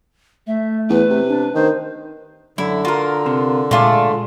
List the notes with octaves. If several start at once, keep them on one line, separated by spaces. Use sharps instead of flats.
A3 E5
E2 B4
C3
D4
D#3 C5
F#2 D3 E4
F4 F#4 A#4
C3
A#2 G#3 A3 F4 G#4 D5 F5